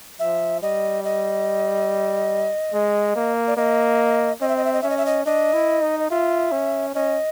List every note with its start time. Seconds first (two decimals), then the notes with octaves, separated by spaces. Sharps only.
0.20 F3 E5
0.61 G3 D#5
1.04 D#5
2.73 G#3
3.15 A#3
3.47 D5
3.57 A#3 D#5
4.41 C4 D#5
4.49 E5
4.57 D#5
4.65 E5
4.73 D#5
4.82 C#4 E5
4.90 D#5
4.98 E5
5.06 D#5
5.25 D4 D#5
5.53 E4
5.81 D#4
6.00 D#5
6.10 F4 E5
6.51 C#4
6.94 C#4 D#5